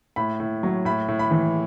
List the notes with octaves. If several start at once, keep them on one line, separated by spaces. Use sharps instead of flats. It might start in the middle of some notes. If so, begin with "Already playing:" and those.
A2 B5
A2
F#3
A2 B5
A2
B5
E3